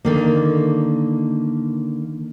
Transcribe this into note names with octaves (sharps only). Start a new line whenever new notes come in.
D3 D#3 A#3